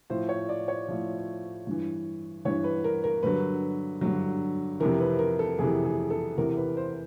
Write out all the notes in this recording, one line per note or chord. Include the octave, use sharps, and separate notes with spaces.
A2 F3 C5
C#5
D5
C#5
A2 F3
G2 E3
G2 E3 C#5
B4
A#4
A#4
G2 D3 F#3 B4
G2 D3 F#3
F2 C3 E3 A#4
B4
A#4
A4
F2 C3 E3 G#4
G#4
A4
E2 C3 E3 A#4
B4
C5